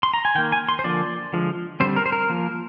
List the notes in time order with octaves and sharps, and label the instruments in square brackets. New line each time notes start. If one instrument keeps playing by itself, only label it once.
[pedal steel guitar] C6
A#5
G#5
D#3 G5
A#3
G#5
C6
C5
D3 F3 A#3 D5
D3 F3 G#3
D3 G3 C4 C5
A#4
C5
A#4
F3 A#3